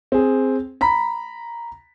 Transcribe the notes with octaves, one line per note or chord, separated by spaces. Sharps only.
C4 G#4
A#5 B5 B6